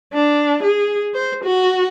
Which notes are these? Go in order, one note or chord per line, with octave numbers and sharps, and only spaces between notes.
D4
G#4
C5
F#4